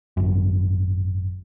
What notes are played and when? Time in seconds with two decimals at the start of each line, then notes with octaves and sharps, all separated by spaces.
0.17 G#1 F#2